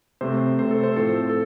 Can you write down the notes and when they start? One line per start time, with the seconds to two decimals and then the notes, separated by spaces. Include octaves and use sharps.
0.21 C3 A3 C4 C5
0.59 C3 A3 C4 C5
0.71 A4
0.83 C5
0.96 A2 F3 C4 A4
1.30 A4